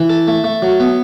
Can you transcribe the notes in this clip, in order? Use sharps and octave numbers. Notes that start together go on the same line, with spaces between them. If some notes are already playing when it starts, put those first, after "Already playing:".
Already playing: E3
A4
A3
A3
F#3
B3